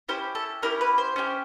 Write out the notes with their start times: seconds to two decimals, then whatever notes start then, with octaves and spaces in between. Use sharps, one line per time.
0.08 C#4 E4 G4 C5
0.35 A4
0.62 C#4 E4 G4 A#4
0.81 B4
0.98 C5
1.16 C#4 E4 G4